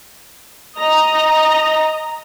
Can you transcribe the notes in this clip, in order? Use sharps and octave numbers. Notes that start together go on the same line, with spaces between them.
D#5 A#5